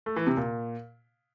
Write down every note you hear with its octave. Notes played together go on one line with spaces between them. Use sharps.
A3
E3
C3
A#2